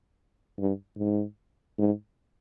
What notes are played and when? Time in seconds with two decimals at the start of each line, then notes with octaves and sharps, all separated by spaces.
0.58 G2
0.98 G#2
1.78 G#2